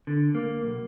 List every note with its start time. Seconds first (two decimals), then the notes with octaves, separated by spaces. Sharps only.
0.07 D3
0.35 A#3
0.65 B1